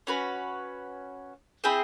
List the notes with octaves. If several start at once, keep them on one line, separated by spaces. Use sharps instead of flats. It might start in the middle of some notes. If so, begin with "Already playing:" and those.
C#4 F#4 B4
C4 E4 G#4 C5